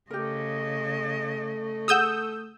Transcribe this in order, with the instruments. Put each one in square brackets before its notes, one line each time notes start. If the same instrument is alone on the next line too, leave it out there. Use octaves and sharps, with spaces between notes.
[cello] C#3 D#5 [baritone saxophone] A3 [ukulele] G4 A#4
[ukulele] G#4 F#5 [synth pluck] D#6 E6 G6